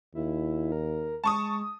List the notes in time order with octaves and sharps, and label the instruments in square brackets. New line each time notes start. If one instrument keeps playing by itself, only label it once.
[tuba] D#2 [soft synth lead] E4
[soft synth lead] A#4
[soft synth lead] G#3 [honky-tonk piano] A5 C#6 D#6